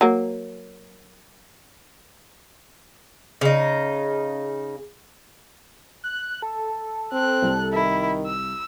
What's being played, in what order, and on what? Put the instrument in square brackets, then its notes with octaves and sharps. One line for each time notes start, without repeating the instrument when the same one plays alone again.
[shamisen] F#3 A#3
[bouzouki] C#3 D#4
[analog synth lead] F#6
A4
[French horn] C4 [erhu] F#6
[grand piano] C2
[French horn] D#3 [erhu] E4
[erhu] E6